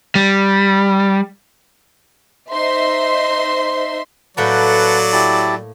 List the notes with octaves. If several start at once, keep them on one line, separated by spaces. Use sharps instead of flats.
G3
D#4 C5 E5 C6
A2 F#3 A3 A#3 B4 D5 F#5 A5
E4 G4 A5